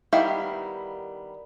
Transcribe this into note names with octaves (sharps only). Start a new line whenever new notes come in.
D#3 G3 B3 E4 F5